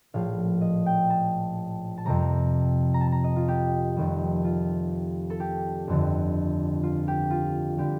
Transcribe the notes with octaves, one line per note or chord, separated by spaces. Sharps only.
A#1 A2 F3 F5
D#5
G5
A5
A5
F2 C3 G3 A#5
A#5
A5
A#5
D#5
F4
G4
F1 F2 D#3 G3
F4
A4
G4
G1 F2 D3
F4
G4
F4
D3 G3 G4